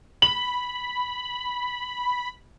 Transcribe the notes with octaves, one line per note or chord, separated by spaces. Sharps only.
B5 F#7